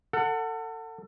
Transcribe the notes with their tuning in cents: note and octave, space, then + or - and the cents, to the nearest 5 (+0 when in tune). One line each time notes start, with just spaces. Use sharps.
A4 +30 F#5 +0